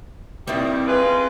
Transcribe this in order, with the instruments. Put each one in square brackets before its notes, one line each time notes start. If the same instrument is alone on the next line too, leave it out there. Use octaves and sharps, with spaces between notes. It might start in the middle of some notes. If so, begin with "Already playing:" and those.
[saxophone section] G2 D#3 G3 [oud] C4 E4
[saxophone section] G#3 F4 B4